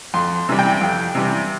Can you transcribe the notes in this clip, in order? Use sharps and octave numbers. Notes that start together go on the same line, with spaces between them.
F2 C6
C3 E3 G3
G5
F2
C3 E3 G3